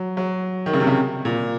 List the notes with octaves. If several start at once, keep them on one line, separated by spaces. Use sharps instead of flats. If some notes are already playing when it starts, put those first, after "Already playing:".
Already playing: F#3
F#3
D#3
C#3
C3
C#3
A#2